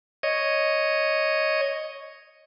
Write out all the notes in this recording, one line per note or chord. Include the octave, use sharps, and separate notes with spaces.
C#5 D#5